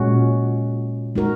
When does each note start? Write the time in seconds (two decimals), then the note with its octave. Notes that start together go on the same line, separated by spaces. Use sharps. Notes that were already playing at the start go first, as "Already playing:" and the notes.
Already playing: A#2 G#3 C#4 F#4
1.15 G#3 D#4 F#4 A#4